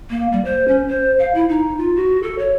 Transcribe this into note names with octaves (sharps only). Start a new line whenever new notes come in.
A#3
G3
C5
C#4
C5
F5
E4
D#4
F4
F#4
A4
C#5